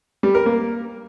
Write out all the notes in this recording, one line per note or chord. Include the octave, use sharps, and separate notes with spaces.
G3
A#4
A#3